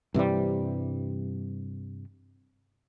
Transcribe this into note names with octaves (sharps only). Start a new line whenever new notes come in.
G2 C3 E3 G3